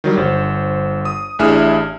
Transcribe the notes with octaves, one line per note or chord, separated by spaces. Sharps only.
D#3 F#3 G3
G1 C5
D#6
A1 D4 E4 G#4 E5 F6